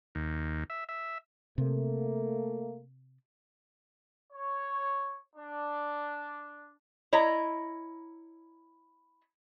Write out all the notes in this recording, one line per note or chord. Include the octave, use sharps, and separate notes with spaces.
D#2
E5
E5
C3 A3 A#3
C#5
D4
E4 C#5 D#5 A#5